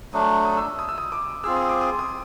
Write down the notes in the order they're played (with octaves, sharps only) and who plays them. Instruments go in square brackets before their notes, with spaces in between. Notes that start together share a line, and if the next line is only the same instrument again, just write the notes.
[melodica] F#3 A3 D4 [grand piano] D#6
[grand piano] D#6
E6
D#6
E6
D#6
D6
[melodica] C4 F4 G#4 [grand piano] E6
[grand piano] D#6
D6
D#6
D#6